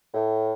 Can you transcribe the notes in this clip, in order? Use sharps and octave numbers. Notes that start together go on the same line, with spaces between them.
A2